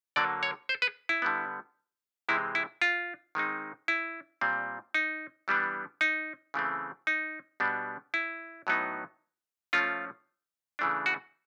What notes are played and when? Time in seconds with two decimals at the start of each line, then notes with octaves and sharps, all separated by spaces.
0.16 D3 F#3 A#3 D5
0.43 C#5
0.69 C5
0.82 B4
1.09 E4
1.22 D3 G3 B3
2.29 C3 E3 G#3 C4 E4
2.55 E4
2.82 F4
3.35 D#3 G#3 C4 D#4
3.88 E4
4.41 A#2 G3 C4
4.94 D#4
5.48 E3 G3 B3 D4
6.01 D#4
6.54 C#3 E3 A3 C4
7.07 D#4
7.60 B2 G3 B3 D4
8.14 E4
8.67 A2 F#3 B3 D#4
9.73 F3 A3 C#4 F4
10.79 C#3 E3 A3 D4
11.06 F#4